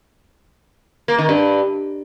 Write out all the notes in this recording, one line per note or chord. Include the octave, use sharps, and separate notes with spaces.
A#3
D#3
G2